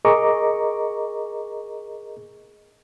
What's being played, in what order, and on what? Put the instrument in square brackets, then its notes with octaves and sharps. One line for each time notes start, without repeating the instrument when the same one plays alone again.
[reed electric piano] G#4 A#4 D#5 A#5 C#6 D6